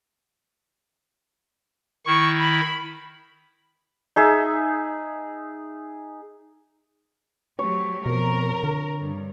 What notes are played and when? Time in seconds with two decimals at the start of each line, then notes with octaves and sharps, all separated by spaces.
2.06 D#3 E4 C#6
2.41 B5
4.16 D#4 G#4 E5
7.59 F#3 A3 G4 C#5
8.06 F2 B2 A#4
8.63 D3
8.99 G2